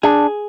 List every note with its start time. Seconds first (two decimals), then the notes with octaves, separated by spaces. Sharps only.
0.03 D4 G#4